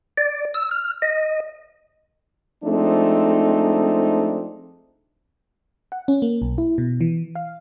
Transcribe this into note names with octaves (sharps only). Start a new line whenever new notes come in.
D5
E6
F6
D#5
F3 G#3 A3 C4 D4 D#4
F#5
C#4
A#3
B1
E4
B2
E3
F5